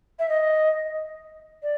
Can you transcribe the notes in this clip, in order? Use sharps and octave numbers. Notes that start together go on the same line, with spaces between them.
E5
D#5
D5